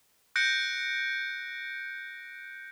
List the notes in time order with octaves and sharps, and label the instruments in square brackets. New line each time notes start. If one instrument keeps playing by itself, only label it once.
[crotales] F#6 G6 A#6 C#7 D7